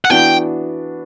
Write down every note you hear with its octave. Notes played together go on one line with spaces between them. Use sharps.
F#5
E3 B3 D4 F#4 G5